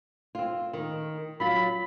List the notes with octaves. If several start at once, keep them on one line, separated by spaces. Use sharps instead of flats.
C4 F4
D#3
F#3 F4 B5